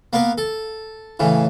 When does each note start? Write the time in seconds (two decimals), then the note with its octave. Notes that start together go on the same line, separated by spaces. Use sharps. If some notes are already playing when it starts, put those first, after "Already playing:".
0.13 A#3 B3 A#4 B4
0.38 A4
1.20 A2 C#3 E3